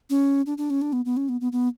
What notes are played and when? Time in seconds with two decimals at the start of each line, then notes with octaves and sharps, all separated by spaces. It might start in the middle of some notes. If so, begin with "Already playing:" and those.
0.10 C#4
0.46 D4
0.58 D4
0.70 C#4
0.82 D4
0.93 B3
1.05 B3
1.17 C#4
1.29 B3
1.41 B3
1.52 B3